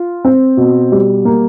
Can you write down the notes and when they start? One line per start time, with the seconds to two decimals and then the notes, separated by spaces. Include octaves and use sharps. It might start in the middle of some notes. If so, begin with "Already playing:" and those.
Already playing: F4
0.25 C4
0.57 B2
0.92 G3
1.25 A#3